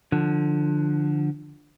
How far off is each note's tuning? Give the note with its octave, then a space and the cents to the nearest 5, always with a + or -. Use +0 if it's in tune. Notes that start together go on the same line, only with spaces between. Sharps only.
D3 +10 F3 -5